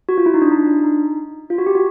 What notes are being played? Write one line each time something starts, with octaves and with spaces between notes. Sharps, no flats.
F#4
F4
E4
D#4
D4
D#4
D4
D#4
F4
F#4
G4
F#4